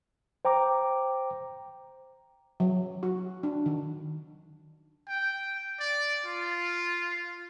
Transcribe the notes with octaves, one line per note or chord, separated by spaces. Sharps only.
C5 G5 A#5 D6
F#3
F#4
D4
D#3
G5
D5
F4